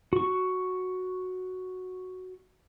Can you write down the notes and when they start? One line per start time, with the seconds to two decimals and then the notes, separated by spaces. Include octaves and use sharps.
0.13 F#4 C#6